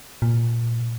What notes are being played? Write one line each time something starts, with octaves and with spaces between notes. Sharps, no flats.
A#2